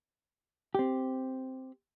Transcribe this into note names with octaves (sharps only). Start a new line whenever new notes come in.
C4 G4